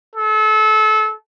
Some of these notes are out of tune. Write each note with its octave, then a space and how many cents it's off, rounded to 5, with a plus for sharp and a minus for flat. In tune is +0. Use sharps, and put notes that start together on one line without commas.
A4 -30